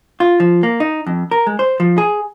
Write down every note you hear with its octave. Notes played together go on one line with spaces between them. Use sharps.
F4
F3
A#3
D#4
F2
A#4
G#3
C5
F3
G#4